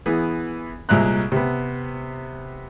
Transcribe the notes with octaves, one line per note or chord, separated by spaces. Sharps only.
E3 B3 G#4
C2 A#2 G#3 E5 A#5 F#6
C3 B3